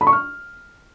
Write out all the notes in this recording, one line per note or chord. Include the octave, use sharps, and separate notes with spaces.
B5
C#6
F6